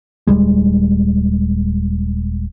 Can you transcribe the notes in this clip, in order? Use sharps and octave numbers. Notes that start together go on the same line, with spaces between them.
D#1 G#2 G3 G#3